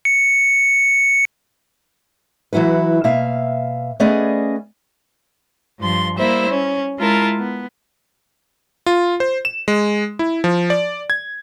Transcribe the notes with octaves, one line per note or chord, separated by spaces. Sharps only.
C#7
E3 F#3 E4 F#4 B4
B2 A#3 E5 F5
A3 B3 C#4 G#4 D5 D#5
G2 F3 C6
G3 A#3 E4 C5 E5
C#4
G#3 E4 F4 A#4 A5
B3
F4
C5
E7
G#3
E4
F3
D5
G#6